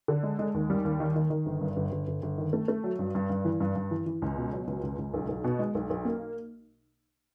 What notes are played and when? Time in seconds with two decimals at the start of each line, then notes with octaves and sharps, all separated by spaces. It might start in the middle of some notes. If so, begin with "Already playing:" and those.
0.08 D3
0.23 G#3
0.39 G#3
0.54 D#2
0.70 G3
0.85 D#2
1.00 D#3
1.16 D#3
1.30 D#3
1.46 G1
1.61 G2
1.76 G1
1.91 G1
2.07 G1
2.22 G1
2.38 D#3
2.53 A3
2.68 A3
2.84 F#3
2.99 G2
3.15 G2
3.30 G2
3.45 E3
3.60 G2
3.76 G2
3.91 E3
4.06 E3
4.22 C#2
4.37 B2
4.53 F#3
4.67 C#2
4.83 C#2
4.98 C#2
5.14 B1
5.29 B1
5.44 B2
5.59 G#3
5.75 B1
5.90 B1
6.05 A#3